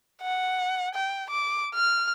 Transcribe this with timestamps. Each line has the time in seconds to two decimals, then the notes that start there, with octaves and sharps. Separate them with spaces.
0.21 F#5
0.94 G5
1.30 D6
1.74 F6